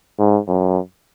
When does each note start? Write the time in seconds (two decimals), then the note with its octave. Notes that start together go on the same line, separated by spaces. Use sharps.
0.19 G#2
0.48 F#2